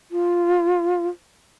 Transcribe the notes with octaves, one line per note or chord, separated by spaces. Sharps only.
F4